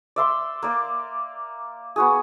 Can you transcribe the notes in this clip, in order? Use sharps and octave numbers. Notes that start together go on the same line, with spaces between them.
D5 E5 C6
A#3 D5
B3 F#4 G#4